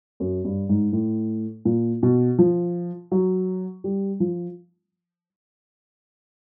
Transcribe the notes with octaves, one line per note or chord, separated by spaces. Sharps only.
F#2
G2
G#2
A2
A#2
B2
F3
F#3
G3
F3